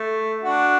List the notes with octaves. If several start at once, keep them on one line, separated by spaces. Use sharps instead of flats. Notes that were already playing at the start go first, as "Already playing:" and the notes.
Already playing: A3
D4 F#4